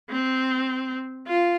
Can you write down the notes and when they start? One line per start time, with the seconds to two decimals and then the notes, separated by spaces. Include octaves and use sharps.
0.10 C4
1.27 F4